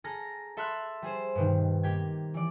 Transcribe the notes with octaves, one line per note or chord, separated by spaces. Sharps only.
G#4 A4 A#5 F6 A#6
A4 E5 B5 C6 F6 F#6
G3 G#4 C5
G2 B2 D#3
A#3 G4 G#6
E3 D5